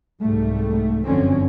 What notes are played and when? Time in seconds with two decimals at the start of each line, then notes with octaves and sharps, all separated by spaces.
0.22 C2 G#2 G3 A3
1.05 G1 F#2 D3 F3 C4 C#4